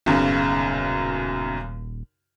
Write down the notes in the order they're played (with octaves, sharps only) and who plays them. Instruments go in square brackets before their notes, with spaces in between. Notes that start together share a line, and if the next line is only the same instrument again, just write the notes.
[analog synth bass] D#1 [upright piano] B1 F#2 C#3